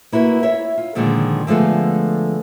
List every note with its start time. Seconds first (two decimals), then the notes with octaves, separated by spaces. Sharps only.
0.12 A#3 E4 F#4 B4
0.43 E4 C#5 E5
0.78 F4
0.95 A#2 D3 D#3 F3 G#3
1.47 D3 F3 G#3 A3 B3